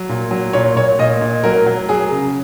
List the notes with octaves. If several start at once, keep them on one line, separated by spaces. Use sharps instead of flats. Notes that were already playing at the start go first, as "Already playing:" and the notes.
Already playing: F#3
A#2
F#3
A#2 C#5
A#2 C#5
A#2 D#5
A#2
F#3 A#4
F#3
F#3 G#4
C#3